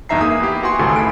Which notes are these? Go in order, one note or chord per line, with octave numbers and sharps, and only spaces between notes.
E2 G2 D#4 E5 A#5 C7
A#3 G#4 D#6
B3 E4 G4
F#4 F#5 G#5 C6
G#1 C#2 A2 E3 A4 G#5
B5 D7